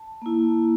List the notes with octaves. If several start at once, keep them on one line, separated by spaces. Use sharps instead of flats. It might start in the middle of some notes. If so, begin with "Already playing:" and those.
Already playing: A5
A#3 E4